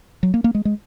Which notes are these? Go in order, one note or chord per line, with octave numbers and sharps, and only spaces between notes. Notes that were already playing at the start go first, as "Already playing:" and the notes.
F#3
A#3
A#3
G#3
G#3